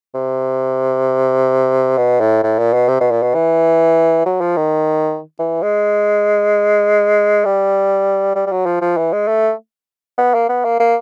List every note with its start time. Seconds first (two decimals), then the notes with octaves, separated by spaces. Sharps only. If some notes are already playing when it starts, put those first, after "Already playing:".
0.14 C3
1.97 B2
2.20 A2
2.43 A2
2.59 A#2
2.73 B2
2.88 C3
3.00 B2
3.11 A#2
3.22 B2
3.34 E3
4.26 F#3
4.41 F3
4.56 D#3
5.39 E3
5.62 G#3
7.45 G3
8.35 G3
8.46 G3
8.52 F#3
8.66 F3
8.81 F3
8.97 E3
9.12 G#3
9.28 A3
10.18 B3
10.34 A#3
10.49 B3
10.64 A#3
10.79 A#3